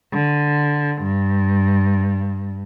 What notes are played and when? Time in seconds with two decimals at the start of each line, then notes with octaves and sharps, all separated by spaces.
0.13 D3
1.02 G2